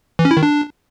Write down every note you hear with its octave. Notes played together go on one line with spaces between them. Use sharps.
E3
C#4
E4
D#3
D4